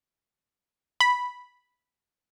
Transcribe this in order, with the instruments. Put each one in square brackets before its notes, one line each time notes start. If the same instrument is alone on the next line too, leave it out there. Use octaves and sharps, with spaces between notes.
[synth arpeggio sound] B5